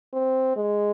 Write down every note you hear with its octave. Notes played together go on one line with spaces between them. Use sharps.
C4
G#3